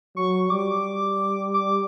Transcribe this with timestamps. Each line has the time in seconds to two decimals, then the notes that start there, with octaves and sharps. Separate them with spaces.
0.16 F#3 C#6
0.50 G3 D6
1.54 D6